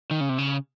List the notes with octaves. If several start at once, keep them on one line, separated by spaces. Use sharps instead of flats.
D#3
C#3
C3
C#3